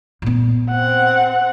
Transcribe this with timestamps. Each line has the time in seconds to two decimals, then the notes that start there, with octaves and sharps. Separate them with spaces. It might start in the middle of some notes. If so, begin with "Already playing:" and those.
0.22 A#2 B3
0.70 C4 F#5